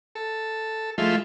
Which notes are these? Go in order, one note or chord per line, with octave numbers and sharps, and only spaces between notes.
A4
F3 G#3 A3 E4 F4